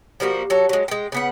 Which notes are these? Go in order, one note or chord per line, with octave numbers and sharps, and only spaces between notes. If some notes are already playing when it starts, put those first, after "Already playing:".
F3 G3 A#3 F#4
F#3 A4
F#3 G#3
G#3 G5
C#3 B3 F#5